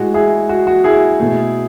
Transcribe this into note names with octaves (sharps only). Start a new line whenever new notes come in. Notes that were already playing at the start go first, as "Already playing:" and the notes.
Already playing: A2 G#3 F#4
E4 G#4
F#4
F#4
E4 G#4
B2 A3